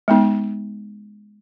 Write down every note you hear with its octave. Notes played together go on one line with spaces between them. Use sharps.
G#3 B3 D#4